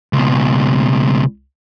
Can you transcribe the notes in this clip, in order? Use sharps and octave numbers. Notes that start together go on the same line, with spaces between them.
C#2 B2